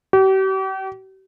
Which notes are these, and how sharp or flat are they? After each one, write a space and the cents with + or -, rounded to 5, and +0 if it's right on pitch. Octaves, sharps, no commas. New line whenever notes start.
G4 -40